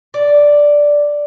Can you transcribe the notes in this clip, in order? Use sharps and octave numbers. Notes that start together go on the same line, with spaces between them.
D5